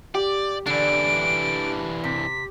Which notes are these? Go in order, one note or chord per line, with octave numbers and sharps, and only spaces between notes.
G4 D5
D3 E3 D4 D7
C3 B6